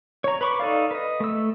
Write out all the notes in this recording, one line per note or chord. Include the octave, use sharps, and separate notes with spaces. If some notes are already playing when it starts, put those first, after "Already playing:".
C#5 A#5
B4 B5 C#6 D6
D#4 A4 D5 F5
B4 D#5
A3 E6